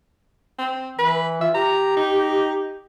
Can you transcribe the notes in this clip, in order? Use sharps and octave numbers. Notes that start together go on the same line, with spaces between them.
C4
E3 B4
F4 E5
G4 A#5
D#4